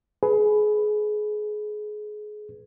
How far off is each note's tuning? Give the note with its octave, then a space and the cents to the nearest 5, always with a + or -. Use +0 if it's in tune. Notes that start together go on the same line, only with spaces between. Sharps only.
G#4 +25 B4 +5